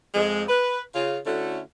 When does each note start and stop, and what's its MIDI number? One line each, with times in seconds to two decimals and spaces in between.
0.14 0.43 41
0.14 0.43 56
0.48 0.79 71
0.94 1.17 49
0.94 1.17 65
1.25 1.59 50
1.25 1.59 57
1.25 1.59 61
1.25 1.59 64
1.25 1.59 66